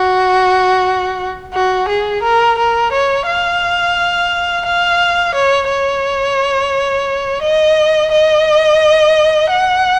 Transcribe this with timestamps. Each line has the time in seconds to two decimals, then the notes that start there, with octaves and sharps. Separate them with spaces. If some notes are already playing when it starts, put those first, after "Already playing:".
Already playing: F#4
1.54 F#4
1.89 G#4
2.23 A#4
2.58 A#4
2.92 C#5
3.27 F5
4.66 F5
5.35 C#5
5.69 C#5
7.42 D#5
8.11 D#5
9.49 F#5